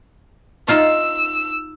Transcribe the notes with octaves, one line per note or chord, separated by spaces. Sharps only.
D#4 F4 C6 E6